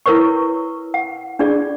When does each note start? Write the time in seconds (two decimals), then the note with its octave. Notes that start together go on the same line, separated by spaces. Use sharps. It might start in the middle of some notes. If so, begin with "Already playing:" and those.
0.06 E4 A#4 B4 C#5 C#6
0.94 F#5
1.39 D4 F4 G#4 D5